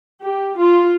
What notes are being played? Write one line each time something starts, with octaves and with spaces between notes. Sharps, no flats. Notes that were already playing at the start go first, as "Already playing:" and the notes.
G4
F4